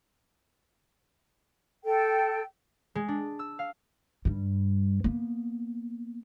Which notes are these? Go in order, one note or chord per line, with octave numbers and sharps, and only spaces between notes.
A4 G5
G#3
D4
E6
F5
G2 G3
A#3 B3